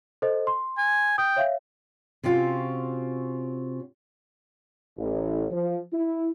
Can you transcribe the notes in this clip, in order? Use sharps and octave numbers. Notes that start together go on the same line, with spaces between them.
A4 C5 D#5
C6
G#5
G5 D#6
C#5 E5 F5
C3 C4 C#4 F4 F#4
A1
F3
E4